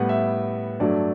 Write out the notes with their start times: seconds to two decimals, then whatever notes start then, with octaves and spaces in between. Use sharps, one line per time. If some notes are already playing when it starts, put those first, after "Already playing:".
Already playing: A2 G3 B3 F#5
0.09 E5
0.80 G2 F#3 A3 D5